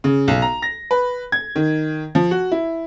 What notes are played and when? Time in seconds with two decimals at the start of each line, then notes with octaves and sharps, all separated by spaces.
0.04 C#3
0.28 B1
0.42 A#5
0.62 A#6
0.91 B4
1.32 G#6
1.56 D#3
2.15 F3
2.31 F#4
2.52 E4